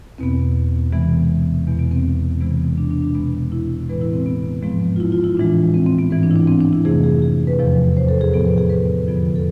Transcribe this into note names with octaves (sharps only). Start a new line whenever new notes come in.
E2 B2 B3 C4
C3 E3 G#3 B3
E2 B2 B3
B3
C4
C3 E3 G#3 B3
D4
D4
D4
B2 G#3 B3
E4
A2 E3 G#3 B3 B4
E4
C4
B3
G#2 F3 G#3 B3
F4
E4
F4
E4
A2 E3 G#3 D4
C4
C4
B3
G#2 E3 B3 C4
D4
E4
D4
C4
D4
E4
F2 C3 E3 A3 G#4
G#4
G#4
B4
E2 C3 F3
C5
A4
G#4
A2 F3 B3 A4
B4
G#4
B4
F2 D3 F3 B3
A4